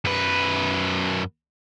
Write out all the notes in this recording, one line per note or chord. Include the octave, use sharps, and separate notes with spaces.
F#2 B4